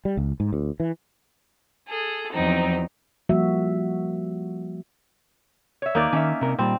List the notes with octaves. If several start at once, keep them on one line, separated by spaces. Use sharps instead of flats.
G3
C#2
G#2
D2
E3
G#4 A4
E2 F3 F#3 C4 D#4
F3 G3 A#3 F#4 E5
C#5 E5
D#2 A#3 D#4 D5
D#3 C#4 E5
C3 A#4
A#2 G3 C4